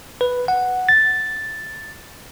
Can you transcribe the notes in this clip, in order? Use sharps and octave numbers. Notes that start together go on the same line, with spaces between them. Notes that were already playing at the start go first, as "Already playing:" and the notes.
B4
F#5
A6